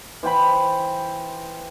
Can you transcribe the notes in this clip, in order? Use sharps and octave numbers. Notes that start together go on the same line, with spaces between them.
E3 C5 G5 B5